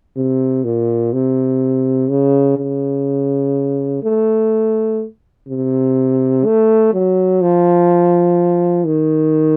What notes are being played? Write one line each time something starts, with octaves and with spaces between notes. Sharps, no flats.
C3
A#2
C3
C#3
C#3
A3
C3
A3
F#3
F3
D#3